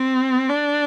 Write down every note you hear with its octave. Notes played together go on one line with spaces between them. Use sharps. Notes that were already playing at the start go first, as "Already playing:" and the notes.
Already playing: C4
D4